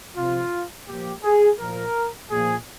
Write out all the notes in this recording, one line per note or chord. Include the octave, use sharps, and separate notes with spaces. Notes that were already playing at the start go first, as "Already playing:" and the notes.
C3 F3 F4
A#2 F3 G4
G#4
A#2 F3 A#4
A#2 F3 G#4